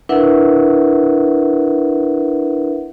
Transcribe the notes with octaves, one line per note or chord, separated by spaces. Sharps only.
D4 E4 A#4 B4 E5 F#5